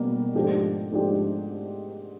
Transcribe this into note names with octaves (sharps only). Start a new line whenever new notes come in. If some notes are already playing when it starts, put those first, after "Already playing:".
Already playing: B2 G3 A#3
G#2 F3 A3 D4 G4
G#2 F3 A3 D4 G4